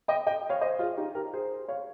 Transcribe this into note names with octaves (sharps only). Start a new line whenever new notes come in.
D#5 G5
D#5 G5
C#5 F5
C5 D#5
F4 G#4
D#4 G4
G4 A#4
G#4 C5
C#5 F5